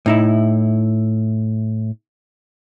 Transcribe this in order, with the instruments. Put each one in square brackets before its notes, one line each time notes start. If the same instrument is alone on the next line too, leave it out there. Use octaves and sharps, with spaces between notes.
[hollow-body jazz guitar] A2 D#4 E4